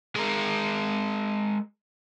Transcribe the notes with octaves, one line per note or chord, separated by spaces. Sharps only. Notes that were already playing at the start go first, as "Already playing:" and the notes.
G#3 A#4